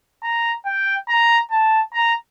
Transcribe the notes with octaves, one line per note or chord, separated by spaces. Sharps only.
A#5
G5
A#5
A5
A#5